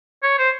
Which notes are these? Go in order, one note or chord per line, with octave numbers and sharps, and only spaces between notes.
C#5
C5